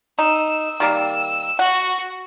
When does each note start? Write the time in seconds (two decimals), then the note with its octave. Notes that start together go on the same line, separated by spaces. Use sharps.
0.19 D#4 E6
0.80 D#3 G3 A#3
1.59 F#4 F#5